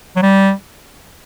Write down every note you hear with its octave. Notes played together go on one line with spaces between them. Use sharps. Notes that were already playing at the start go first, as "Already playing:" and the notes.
F#3
G3